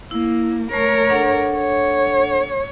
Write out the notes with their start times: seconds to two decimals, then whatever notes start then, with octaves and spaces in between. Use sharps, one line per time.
0.11 A#3 E4
0.72 A3 A#4 C#5 C#6
1.10 D4 A4 F#5
1.58 C#5